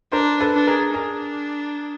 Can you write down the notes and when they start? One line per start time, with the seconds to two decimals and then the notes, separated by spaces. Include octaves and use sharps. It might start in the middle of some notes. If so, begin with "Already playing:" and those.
0.12 D4 A#4 C5
0.41 A4 B4
0.54 D4
0.67 G#4 A#4
0.94 D4 G#4 A#4